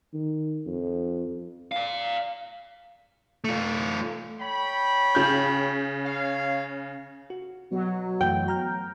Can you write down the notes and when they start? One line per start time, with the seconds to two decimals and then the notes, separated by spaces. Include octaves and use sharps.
0.13 D#3
0.66 F2
1.72 D5 F5
3.44 A3 F4
4.41 C#5 G5 B5
5.15 C#3 G6
6.05 C#5 F5
7.30 F#4
7.71 B2 F#3
8.21 F#2 E3 A3 G5
8.48 A#5 F6 G6